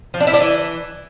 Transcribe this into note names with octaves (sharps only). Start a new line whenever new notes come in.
F3
D4
E4
D4
E3